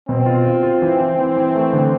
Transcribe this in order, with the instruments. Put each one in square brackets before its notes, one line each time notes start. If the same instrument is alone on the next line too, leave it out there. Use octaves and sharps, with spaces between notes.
[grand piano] B2 [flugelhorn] C4
[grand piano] F4
F4
F4
E3
E3
E3
E3
A3
D3